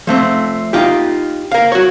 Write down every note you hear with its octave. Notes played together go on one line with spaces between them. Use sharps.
F3 A3 C4
D#4 F4 G4
A#4 F5
F#4 C#5